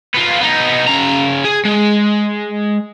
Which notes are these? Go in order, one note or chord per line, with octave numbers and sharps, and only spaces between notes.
B3 F4
B3 D#4
C#3 A#5
G#4
G#3